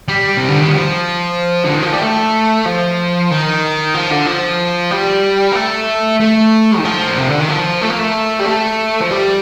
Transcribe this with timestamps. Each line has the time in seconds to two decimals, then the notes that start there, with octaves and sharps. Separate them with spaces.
0.08 G3
0.37 C3
0.48 D3
0.61 D#3
0.72 F3
1.64 D3
1.73 D#3
1.82 F3
1.92 G3
2.01 A3
2.65 F3
3.31 D#3
3.94 F3
4.11 D3
4.26 F3
4.91 G3
5.52 A#3
5.56 A3
6.20 A3
6.79 D#3
6.85 F3
7.08 A#2
7.18 C3
7.29 D3
7.40 D#3
7.49 F3
7.82 A3
7.90 A#3
7.99 A3
8.40 G3
8.46 A3
9.01 F3
9.11 G3